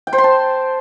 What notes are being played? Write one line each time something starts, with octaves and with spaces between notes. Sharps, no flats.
G5
C5
C6
A5